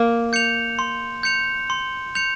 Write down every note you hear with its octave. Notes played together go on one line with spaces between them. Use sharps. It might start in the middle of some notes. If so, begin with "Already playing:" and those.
Already playing: A#3
G6 C#7 F7
C6
G6 C#7 F7
C6
G6 C#7 F7